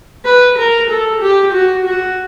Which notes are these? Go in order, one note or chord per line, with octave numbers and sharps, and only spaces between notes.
B4
A#4
A4
G4
F#4
F#4